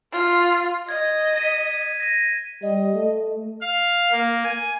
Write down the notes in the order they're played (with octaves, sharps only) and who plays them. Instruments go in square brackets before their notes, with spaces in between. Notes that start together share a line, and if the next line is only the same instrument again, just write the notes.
[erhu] F4
[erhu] D#5 [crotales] G#6
[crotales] B6 D#7
A#6 D#7
[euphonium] G3 [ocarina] D#5
[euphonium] A3
[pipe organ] F5
A#3
G#5